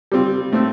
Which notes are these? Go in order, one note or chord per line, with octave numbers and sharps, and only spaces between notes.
G3 C4 F4
A2 A3 C4